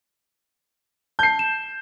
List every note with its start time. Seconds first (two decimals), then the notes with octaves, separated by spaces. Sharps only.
1.19 A5 G6 C7
1.39 E7